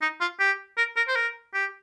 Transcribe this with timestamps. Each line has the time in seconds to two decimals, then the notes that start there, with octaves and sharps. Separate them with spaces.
0.02 D#4
0.21 F4
0.40 G4
0.77 A#4
0.96 A#4
1.08 C5
1.15 A#4
1.54 G4